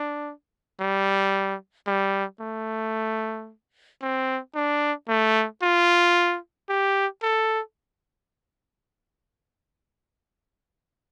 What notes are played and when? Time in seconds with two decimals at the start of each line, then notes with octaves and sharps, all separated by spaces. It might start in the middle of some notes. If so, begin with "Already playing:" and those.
Already playing: D4
0.80 G3
1.87 G3
2.41 A3
4.02 C4
4.55 D4
5.08 A3
5.63 F4
6.69 G4
7.23 A4